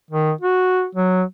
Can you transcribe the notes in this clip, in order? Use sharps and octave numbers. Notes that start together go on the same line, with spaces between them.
D#3
F#4
F#3